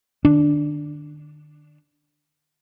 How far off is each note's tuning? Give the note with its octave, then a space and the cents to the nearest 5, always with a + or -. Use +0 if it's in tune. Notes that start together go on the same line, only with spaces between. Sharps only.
D3 +45 D4 +0